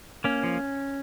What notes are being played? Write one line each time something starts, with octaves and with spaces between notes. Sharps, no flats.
A#3 C#4
F3